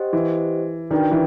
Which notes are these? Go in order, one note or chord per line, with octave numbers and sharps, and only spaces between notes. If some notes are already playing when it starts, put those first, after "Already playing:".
Already playing: G4 C5 D#5 F#5
E3
D#3 D4 F#4 B4 D5 G5
E3